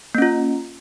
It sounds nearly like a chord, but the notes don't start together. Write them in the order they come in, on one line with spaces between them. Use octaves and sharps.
A#3 C#4 F4